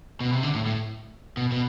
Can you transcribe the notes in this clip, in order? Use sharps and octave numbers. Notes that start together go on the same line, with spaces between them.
B2
C3
D3
A2
A2
B2
B2